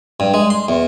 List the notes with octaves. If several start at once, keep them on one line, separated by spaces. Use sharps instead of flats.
G2
G#3
C6
E2